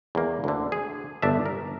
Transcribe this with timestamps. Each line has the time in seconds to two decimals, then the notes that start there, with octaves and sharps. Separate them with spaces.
0.15 E2 A#3
0.44 D2 D3
0.72 G#4
1.22 G1 D4 E5
1.46 A#4